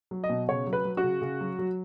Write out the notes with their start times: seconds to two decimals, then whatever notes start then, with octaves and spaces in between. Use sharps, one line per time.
0.11 F#3
0.24 D#5
0.29 B2
0.49 C#3 C#5
0.67 F#3
0.73 B4
0.85 F#3
0.97 F#4
1.04 C#3
1.22 C#3
1.41 F#3
1.59 F#3